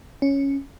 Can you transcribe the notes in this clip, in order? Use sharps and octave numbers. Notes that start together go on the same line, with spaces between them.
C#4